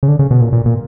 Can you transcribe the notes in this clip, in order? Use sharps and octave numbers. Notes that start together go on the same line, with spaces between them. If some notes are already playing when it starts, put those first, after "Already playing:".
C#3
D3
C#3
B2
A#2
A#2
A#2